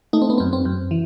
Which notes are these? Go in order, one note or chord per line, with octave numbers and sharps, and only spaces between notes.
A3 D#4
C4
B3
F#2 C4
C4
F#2
E3